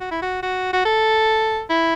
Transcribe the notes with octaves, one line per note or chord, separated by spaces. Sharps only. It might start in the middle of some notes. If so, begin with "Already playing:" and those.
F#4
E4
F#4
F#4
F#4
A4
E4